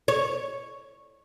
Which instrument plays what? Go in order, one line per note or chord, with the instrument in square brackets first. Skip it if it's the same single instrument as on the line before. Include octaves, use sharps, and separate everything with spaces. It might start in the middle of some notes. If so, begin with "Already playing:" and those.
[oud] C#5